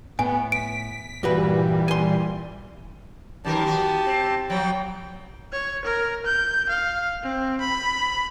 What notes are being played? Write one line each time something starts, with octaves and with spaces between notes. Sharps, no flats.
A2 B3 G#5
B6 D7
G2 A#2 E3 G3 F#4 B4
G#5 C6
F#2 D#3 G4 A#4 A5
B3 F#4
C4
F3 F#3 G5
C#5
A#4
G6
F5
C4
B5